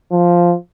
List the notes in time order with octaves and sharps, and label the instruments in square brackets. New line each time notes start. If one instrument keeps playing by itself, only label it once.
[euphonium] F3